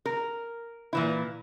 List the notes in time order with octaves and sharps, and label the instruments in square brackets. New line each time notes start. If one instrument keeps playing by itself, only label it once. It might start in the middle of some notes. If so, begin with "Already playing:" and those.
[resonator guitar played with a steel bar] A#4
A#2 E3 E4